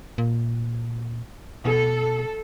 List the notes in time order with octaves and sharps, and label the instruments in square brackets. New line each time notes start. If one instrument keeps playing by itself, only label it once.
[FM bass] A#2
[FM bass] B2 [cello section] A4